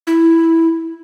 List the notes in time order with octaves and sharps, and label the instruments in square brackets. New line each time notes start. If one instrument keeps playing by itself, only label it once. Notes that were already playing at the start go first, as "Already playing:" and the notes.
[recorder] E4